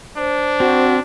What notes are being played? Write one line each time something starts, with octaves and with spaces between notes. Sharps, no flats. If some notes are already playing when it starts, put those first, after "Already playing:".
D4 C5
C4 F#4